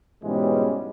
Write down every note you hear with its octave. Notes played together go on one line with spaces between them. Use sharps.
G#2 B2 E3 G3 G#3 C#4